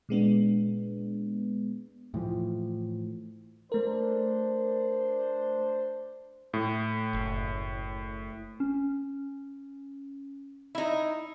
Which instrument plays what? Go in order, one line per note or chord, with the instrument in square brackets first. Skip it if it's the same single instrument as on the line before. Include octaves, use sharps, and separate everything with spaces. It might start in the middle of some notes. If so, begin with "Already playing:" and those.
[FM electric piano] A#2 G#3 B3 D4
[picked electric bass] A2 E3 F3
[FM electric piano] A3 A#4 [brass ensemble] D4 C5
[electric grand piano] A2
[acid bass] F#1
[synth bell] C#4
[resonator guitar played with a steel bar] D#4 E4